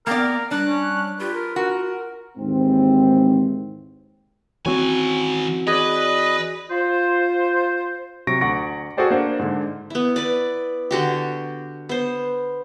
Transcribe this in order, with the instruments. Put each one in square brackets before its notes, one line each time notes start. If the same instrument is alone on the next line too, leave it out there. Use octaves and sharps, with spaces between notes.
[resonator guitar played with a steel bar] A#3 D5 [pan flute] B3 [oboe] A#4 [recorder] G5
[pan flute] G3 [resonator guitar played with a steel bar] D4 [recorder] F#6
[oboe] C#4
[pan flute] F4 [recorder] G4 [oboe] B4
[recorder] A#4
[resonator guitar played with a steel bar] F#4 [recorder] A#4
[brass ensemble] D#2 G#2 E3 C4
[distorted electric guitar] D#3 G#5 [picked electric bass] E3 C4 [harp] C#4 F#4 C#5
[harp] G#4 D5 [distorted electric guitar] B4 [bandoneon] D#5
[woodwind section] F4 C5
[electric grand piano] C3 F#3 C#6 A#6 D7
D2 F#5 C#6 A#6 D7
F#4 G#4 A4 C5 D5 G5
A#3 D4 C5 F#5
G#2 D3
[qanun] B3 E4
B4 D5
D3 F#4 G4
B3 C5